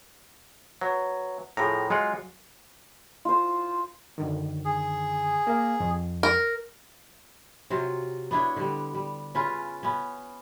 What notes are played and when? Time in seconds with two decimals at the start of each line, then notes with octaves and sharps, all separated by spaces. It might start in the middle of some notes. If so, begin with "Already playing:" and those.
0.81 F#3 B4
1.57 A2 F3 G#4 A#5
1.90 F#3 G#3 F4 F#5
3.25 F4 C5
4.18 F#2 D3 D#3
4.65 G#4
5.47 A#3 F5
5.80 F2
6.23 A#4
7.70 C3 F#3 F4
8.31 B3 D4 E4 C#5
8.56 D3 G3
8.94 G3
9.35 C#3 C#4 F4 B4
9.83 B3 C#4